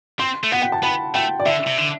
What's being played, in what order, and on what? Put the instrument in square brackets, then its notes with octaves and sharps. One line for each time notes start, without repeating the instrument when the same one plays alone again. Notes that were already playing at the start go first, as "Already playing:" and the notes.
[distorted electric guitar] C4 [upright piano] C6
[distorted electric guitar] A3
[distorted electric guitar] B3 [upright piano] F#5
[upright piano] G5
A5
[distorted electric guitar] B3 [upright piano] B5
[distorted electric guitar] A3 [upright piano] G5
[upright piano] D5
[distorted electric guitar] D3 [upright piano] E5
[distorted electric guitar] C3
D3